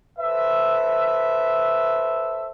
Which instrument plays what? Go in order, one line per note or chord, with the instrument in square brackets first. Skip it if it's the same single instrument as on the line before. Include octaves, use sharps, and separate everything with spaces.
[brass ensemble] A4 B4 C5 E5